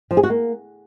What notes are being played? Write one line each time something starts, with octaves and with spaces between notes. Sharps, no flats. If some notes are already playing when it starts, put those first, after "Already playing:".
F3
G#4
F#4
A#3